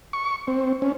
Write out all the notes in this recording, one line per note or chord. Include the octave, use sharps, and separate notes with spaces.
C#6
C4
C#4